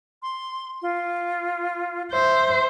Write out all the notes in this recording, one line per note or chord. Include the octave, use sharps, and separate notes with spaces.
C6
F4
C5 E5